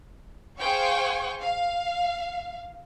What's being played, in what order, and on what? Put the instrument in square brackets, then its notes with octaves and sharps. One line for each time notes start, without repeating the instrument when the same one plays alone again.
[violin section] G#4 C5 F5 G5 G#5 C#6
F5